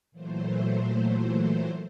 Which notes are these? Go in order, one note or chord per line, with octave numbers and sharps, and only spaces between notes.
A#2 E3 F#3 A3 C5